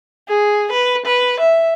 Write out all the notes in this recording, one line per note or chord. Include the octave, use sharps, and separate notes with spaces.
G#4
B4
B4
E5